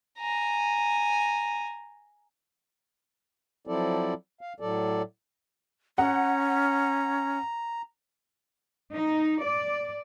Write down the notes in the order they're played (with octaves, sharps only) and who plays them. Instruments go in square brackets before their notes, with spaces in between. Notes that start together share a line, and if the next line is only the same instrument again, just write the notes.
[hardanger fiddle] G#5 A#5
[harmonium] F3 F#3 C4 E4 A4 D5
F5
A2 F#3 A4 D5
[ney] C#4 [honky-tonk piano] F#5 [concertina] A#5
[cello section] D#4
D5